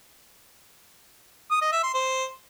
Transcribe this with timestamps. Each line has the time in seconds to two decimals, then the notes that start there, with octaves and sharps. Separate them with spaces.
1.51 D#6
1.62 D#5
1.72 E5
1.83 C6
1.94 C5